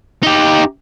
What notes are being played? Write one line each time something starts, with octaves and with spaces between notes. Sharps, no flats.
D#4 G4